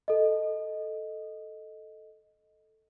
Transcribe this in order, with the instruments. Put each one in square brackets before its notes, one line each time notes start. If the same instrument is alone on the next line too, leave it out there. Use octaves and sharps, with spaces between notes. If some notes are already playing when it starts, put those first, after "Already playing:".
[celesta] A4 D#5